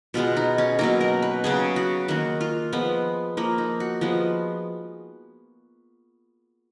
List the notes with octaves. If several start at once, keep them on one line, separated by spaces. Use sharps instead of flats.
B2 G#3 B3 F4
D#4
C#4
B2 F#3 A#3 D#4
A#4
B4
C#3 F#3 B3 G#4
F#4
D#3 A#3 F#4
F4
F3 G#3 B3
F3 A#3
D#4
F#4
F3 G#3 B3